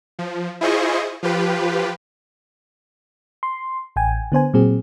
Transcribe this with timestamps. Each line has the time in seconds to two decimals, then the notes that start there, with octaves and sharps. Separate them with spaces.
0.19 F3
0.61 E4 F4 G#4 C5 D#5 C#6
1.23 F3 F4 G4 B4
3.43 C6
3.96 A1 G5 G#5
4.32 D3 B3 C5 G#5
4.54 A#2 F#3 C4 G#4